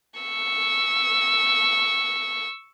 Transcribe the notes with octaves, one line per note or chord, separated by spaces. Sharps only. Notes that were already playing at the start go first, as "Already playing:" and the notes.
C#6 E6